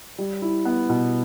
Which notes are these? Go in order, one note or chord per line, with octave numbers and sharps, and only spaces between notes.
G3
E4
B3
B2